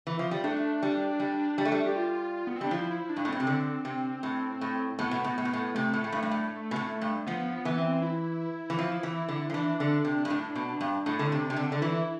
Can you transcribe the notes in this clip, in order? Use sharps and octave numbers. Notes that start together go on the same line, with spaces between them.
E3
F3
G3
A3 D4
G3
G3
G3
A3
G3
G4
F4
B3
C4
G3 D4
F3 E4
E4
D4
G2
A2
B2 C4
C3
D3
C3
A2
A2
A2 B3
B2
A2
A2
B2
A2
C3 A3
A2
A2
G2
G2
A2
B2
A2
G2
F3 B3
B3
E3
C4
E4
E3
F3
E3
D3
F3
E3 D4
D3
C3
G2
A2 D4
B2
G2
A2 D4
D3
C3
C3
D3
D3
E3 E4